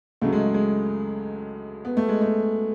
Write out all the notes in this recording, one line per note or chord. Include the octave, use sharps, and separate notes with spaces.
C#2 C#3 F#3 A3
G#3
G#3
B3
A3
G#3
A3